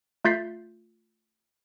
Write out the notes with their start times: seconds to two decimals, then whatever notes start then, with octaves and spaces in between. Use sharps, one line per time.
0.25 A3 F4 G6 A6 B6 C7